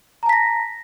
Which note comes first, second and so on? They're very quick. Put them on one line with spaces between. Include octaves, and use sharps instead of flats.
A#5 A5 B6 A#6